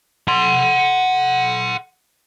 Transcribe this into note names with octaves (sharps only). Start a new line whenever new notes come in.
F#5 C6